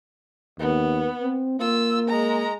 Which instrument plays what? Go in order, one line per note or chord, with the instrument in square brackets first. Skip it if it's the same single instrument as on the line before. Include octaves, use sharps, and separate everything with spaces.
[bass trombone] D#2 [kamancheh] B3
[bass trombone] C4
[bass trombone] A#3 [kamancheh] F4 E6
[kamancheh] G#3 A#5